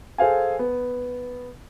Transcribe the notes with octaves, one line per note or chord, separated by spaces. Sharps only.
G#4 A4 C5 F5 G#5
B3